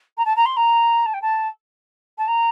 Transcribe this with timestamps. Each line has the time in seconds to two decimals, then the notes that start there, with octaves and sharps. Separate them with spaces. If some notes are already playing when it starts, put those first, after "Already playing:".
0.18 A#5
0.25 A5
0.36 A#5
0.46 C6
0.57 A#5
1.06 A5
1.14 G5
1.22 A5
2.18 A5
2.28 A#5